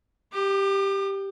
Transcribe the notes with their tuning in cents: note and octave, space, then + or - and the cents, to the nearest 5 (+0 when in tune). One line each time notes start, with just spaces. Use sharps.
G4 +0 D6 +40